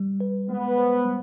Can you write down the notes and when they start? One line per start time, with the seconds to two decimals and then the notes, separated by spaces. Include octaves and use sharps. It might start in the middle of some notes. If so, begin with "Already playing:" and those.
Already playing: G3
0.20 B4
0.49 G#3 B3
0.78 C5
1.05 G3